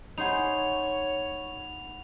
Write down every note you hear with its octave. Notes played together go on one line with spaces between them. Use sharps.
D#4 C5 C#5 F#5 G#5 B5 F7